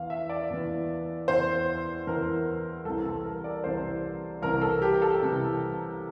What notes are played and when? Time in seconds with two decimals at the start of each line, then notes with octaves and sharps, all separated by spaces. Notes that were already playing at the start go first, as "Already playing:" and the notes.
Already playing: E2 E3 F5
0.10 E5
0.29 D5
0.50 E2 E3
1.28 E2 E3 C5
2.07 E2 E3 A#4
2.85 C2 A4
2.88 C3 E3
3.05 A4
3.24 A#4
3.44 D5
3.64 C2 C3 E3 C5
4.42 C2 C3 E3 A#4
4.61 A4
4.82 G4
5.02 A4
5.21 C2 C3 E3